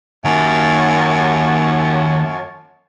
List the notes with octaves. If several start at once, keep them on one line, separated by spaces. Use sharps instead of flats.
F#2 D#3 A#3 F4 C#5 A5